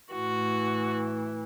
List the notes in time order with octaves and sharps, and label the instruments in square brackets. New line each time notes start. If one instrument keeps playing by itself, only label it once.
[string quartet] A2 E3 F#4